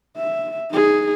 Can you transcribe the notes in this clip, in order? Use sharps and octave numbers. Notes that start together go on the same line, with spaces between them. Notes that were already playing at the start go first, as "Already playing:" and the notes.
E5
D#4 G#4